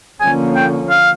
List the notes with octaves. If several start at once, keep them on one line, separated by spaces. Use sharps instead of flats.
D3 F3 A#3 C#4 G#5
G5
F5